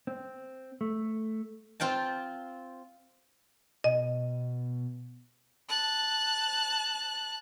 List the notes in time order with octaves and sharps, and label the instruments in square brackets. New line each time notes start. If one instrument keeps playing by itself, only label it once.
[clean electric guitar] C4
A3
[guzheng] C4 F4 G5 A5
[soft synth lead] B2 [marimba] D#5
[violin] A5 F#6